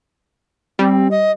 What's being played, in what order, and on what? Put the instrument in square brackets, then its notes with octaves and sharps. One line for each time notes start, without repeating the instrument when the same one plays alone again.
[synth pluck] G3 [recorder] C4
[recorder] D#5